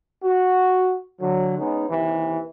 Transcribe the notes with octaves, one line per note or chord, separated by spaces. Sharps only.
F#4
D3 F#3
G#3 B3 C#4 D#4
D#2 C3 E3